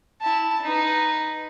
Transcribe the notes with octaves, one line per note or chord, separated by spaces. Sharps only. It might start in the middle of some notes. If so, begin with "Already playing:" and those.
E4 A5
D#4 B4